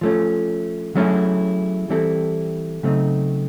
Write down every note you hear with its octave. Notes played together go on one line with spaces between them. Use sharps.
F3 A3 C#4
F#3 A3 C#4 E4 G#4
E3 G3 C4 E4 A4
C#3 F#3 A3 C4 D#4